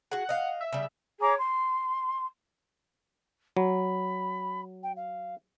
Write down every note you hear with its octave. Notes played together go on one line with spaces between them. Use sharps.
F#4 G#4 F#5
D#5 F5
E5
C#3 G3 E5
G#4 C#5 A#5 D6
C6
F#3 B5
G5
F5